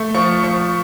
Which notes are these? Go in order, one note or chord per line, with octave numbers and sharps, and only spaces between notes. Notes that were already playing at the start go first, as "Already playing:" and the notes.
Already playing: A3
F3 C#6
F3 C#6